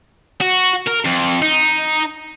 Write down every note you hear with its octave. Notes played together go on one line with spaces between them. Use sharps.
F#4
A#4
F2
D#4